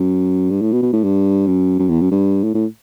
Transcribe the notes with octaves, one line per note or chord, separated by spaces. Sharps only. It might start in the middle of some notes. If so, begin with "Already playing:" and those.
Already playing: F#2
G2
A2
B2
B2
A2
G2
F#2
F#2
E2
F#2
G2
A2
A2